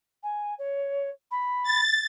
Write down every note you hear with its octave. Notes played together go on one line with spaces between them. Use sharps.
G#5
C#5
B5
A6